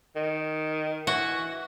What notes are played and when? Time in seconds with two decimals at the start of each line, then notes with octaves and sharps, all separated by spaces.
0.16 D#3
1.07 E3 F#4